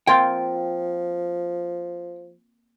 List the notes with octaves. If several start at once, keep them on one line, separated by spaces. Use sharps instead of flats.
F3 A#3 C4 F4 G5